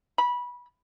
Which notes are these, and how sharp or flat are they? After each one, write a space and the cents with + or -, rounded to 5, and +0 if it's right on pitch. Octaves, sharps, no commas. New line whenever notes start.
B5 -20